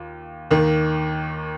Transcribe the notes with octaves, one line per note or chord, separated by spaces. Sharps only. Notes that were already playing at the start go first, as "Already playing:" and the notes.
Already playing: D#2 F4
D#2 D#3 A#3